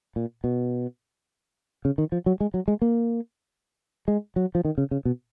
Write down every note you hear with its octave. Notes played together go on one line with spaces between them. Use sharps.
A#2
B2
C#3
D#3
F3
F#3
G#3
F#3
G#3
A#3
G#3
F#3
F3
D#3
C#3
C#3
B2